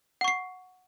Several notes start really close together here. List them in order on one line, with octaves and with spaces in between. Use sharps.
F#5 C#6 C7